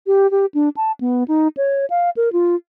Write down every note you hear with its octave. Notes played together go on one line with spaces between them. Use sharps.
G4
G4
D4
A5
B3
D#4
C#5
F5
A#4
F4